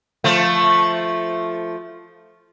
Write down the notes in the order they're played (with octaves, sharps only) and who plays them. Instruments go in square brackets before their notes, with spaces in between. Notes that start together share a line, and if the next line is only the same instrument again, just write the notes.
[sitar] F3 A3